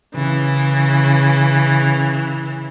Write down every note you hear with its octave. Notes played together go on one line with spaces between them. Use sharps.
C#3 E3